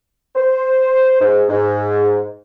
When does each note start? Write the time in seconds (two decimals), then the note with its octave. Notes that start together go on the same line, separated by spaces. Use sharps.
0.35 C5
1.20 G#2
1.49 G#2